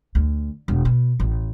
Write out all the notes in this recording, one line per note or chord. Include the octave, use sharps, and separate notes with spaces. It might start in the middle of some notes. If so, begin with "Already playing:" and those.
D2
E1
B2
A1